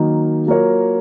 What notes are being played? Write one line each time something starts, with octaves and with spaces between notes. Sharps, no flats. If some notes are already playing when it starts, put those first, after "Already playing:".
Already playing: D#3 F#3 A#3 D#4 A#4
F#3 A#3 F4 A#4 C#5